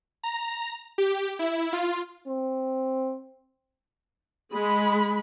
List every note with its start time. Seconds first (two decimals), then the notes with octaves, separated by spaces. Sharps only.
0.23 A#5
0.98 G4
1.39 E4
1.73 F4
2.27 C4
4.53 G#3 B5